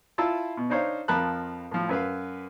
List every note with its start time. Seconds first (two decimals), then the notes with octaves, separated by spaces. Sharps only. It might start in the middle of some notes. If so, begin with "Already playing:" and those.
0.18 E4 F4 A5 E6
0.57 B2
0.70 D4 D#4 C5 C#5 F5
1.08 F2 F3 A#4 A5 B5 F#6
1.71 A2 F3
1.89 F#2 B4 F5